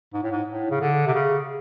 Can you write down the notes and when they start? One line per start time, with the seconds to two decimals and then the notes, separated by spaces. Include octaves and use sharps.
0.13 G#2
0.23 A2
0.31 G#2
0.48 A2
0.71 C#3
0.81 D3
1.06 C3
1.14 C#3